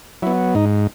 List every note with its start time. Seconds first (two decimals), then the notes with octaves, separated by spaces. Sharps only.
0.22 F#3 B3 E4
0.55 G#2 D#4